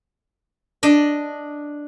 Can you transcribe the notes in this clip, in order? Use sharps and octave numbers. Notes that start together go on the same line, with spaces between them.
D4 D#5